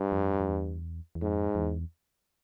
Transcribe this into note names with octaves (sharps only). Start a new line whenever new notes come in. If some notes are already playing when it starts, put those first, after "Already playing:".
Already playing: G2
F2
F2
E2
E2
F2 G#2
F2
E2